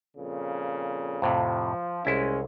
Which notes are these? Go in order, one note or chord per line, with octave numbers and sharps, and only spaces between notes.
F2 A#2 C#3
F2 A2 C3 F3
C2 G#3 C#4 E4